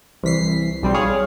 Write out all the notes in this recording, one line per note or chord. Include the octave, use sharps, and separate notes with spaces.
C2 E3 B6 C7
B1 G3 C4
G#4 C#5 F5